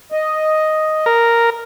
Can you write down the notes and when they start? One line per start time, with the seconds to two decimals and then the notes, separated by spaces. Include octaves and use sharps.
0.12 D#5
1.06 A#4